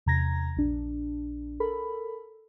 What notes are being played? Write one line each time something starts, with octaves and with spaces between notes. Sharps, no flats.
E2 C3 A#5 G#6 A#6
A#1 D4
A4 A#4 B5